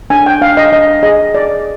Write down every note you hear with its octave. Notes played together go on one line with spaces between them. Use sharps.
D4 G#5
G5
D4 F5
D#5
D4 D#5
G#4 D#5
G#4 D5